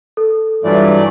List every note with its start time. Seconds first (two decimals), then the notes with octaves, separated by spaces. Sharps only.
0.17 A4
0.64 G2 E3 F#3 A3 F4 D5